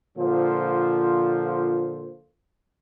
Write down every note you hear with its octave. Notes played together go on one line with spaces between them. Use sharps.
A#2 D3 F3 F4 C5